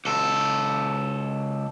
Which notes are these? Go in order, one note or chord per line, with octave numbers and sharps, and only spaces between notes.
C#2 A4